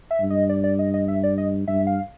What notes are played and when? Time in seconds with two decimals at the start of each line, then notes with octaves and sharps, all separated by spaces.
0.11 E5
0.20 G2
0.30 D#5
0.49 D5
0.64 D5
0.79 D#5
0.94 D#5
1.08 E5
1.23 D5
1.38 D#5
1.68 G2 E5
1.87 F5